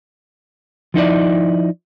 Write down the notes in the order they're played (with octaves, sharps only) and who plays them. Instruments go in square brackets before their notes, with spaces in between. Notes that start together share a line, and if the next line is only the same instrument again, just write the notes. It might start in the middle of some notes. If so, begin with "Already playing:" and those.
[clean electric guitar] F3 D#4 E4 D5